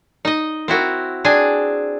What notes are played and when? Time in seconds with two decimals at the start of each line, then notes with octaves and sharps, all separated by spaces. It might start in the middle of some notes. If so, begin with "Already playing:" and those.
0.25 D#4 D#5
0.68 C4 E4 F#4 A#4
1.24 C4 D4 G#4 G#5